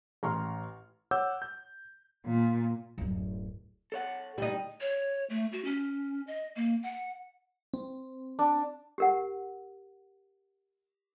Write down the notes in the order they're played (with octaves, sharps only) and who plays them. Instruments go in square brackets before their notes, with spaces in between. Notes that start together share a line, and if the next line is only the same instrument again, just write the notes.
[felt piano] A1 A#5 C6 C#6 F6
[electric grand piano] C#5 F#5 D6 E6 G6
G6
[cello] A#2
[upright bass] D1 F#2
[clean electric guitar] A4 C#5 F#5
[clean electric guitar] D2 [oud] G3 D#4
[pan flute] C#5
A3
F#4
C#4
D#5
A#3
F#5
[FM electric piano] C4
[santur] D4
[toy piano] G4 A#4 F#5